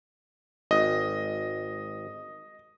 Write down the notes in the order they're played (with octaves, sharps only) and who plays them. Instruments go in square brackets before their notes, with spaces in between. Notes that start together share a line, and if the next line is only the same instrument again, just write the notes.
[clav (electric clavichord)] G#1 [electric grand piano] D#5